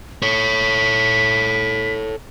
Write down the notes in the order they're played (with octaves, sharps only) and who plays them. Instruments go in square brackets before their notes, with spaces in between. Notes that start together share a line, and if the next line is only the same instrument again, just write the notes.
[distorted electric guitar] A4 C#5 [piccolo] B6